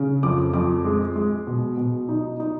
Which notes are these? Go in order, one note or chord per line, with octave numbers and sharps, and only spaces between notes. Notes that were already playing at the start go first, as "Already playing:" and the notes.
Already playing: C#3
F2 D6
F2 D6
G#3
G#3
B2
B2
D#4
D#4